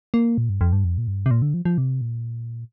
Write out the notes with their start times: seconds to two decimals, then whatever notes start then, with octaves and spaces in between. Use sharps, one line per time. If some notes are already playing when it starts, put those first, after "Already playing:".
0.14 A#3
0.38 A#2
0.49 G2
0.61 F2
0.73 G2
0.84 F2
0.98 A#2
1.07 G2
1.26 C3
1.31 A#2
1.42 D3
1.54 F3
1.65 F3
1.78 C3
2.01 A#2